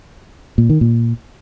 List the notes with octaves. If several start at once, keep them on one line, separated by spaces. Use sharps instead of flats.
A#2
D#3
A#2